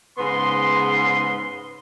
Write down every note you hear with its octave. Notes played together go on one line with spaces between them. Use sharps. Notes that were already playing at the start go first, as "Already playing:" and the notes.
G#2 C#3 B3 C6